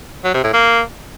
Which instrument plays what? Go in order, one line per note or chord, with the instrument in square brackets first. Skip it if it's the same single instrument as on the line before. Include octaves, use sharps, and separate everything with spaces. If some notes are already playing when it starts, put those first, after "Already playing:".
[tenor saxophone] F#3
C3
A2
A#3